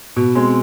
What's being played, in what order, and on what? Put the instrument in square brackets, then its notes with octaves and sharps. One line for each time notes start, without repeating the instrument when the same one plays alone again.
[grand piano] B2
G#3 C4